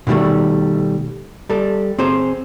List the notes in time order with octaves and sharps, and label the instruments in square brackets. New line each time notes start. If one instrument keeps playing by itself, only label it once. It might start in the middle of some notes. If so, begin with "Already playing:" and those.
[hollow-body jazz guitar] B2 D3 D#3 G3 A3
G3 A4
C4 G#4 C5